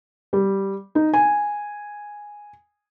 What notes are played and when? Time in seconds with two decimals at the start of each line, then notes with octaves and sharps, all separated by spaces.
0.33 G3
0.95 D#4
1.13 G#5